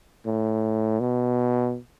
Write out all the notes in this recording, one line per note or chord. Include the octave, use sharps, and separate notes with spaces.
A2
B2